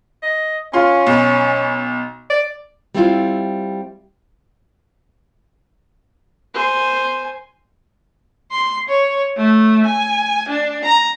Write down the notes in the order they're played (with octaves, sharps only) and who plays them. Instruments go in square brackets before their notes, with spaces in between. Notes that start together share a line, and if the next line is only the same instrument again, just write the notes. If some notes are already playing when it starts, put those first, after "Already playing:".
[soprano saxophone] D#5
[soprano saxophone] C#4 [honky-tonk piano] F4 C6
[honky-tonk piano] B1
[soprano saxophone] D5
[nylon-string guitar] G3 C4 E4 F4
[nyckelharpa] C5 G#5
[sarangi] C6
C#5
A3
G#5
D4
A#5